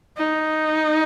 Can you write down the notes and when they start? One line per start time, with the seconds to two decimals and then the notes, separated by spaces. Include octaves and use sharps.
0.17 D#4